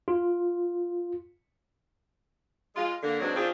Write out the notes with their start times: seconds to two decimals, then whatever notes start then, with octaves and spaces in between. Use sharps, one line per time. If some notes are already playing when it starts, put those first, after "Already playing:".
0.08 F4
2.76 G#3 F4
3.03 D3 A#3
3.20 G#2 B2 F#3 C4 D4
3.36 D#3 C4 D4 F4 G#4